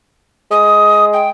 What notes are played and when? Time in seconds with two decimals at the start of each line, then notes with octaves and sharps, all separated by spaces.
0.51 G#3 D#6
1.13 G5